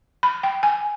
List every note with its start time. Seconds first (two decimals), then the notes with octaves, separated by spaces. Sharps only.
0.23 B5
0.43 G5
0.63 G#5